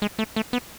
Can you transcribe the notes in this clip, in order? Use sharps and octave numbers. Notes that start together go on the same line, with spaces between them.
G#3
A3
A3
B3